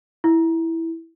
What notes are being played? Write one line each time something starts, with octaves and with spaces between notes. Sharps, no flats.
E4